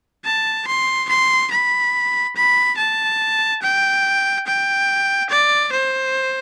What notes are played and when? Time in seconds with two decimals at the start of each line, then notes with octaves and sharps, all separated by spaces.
0.25 A5
0.67 C6
1.10 C6
1.51 B5
2.36 B5
2.78 A5
3.62 G5
4.47 G5
5.31 D5
5.73 C5